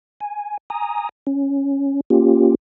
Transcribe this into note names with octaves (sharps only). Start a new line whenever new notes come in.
G#5
G#5 A#5 D#6
C#4
A#3 C#4 F4 G4